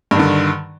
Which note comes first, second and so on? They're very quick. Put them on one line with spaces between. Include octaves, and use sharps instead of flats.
G2 D#3 D3